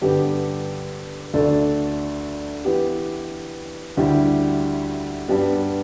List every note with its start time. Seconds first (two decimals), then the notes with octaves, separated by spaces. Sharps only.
0.01 G2 D3 B3 G4
1.33 D2 D3 A3 D4 A4
2.65 E3 B3 G4
3.97 D2 D3 G3 E4 G4
5.28 G2 G3 B3